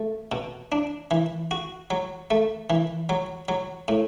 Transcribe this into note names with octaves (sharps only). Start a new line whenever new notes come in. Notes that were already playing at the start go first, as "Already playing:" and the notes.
Already playing: A3
B2
D4
E3
F#4
F#3
A3
E3
F#3
F#3
A2